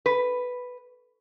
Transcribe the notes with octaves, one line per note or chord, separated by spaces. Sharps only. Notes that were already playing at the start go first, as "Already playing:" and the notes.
B4